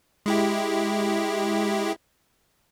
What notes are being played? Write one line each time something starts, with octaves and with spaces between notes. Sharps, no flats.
G#3 E4 G4